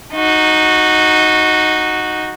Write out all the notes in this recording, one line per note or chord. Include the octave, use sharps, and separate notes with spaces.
D#4 F#4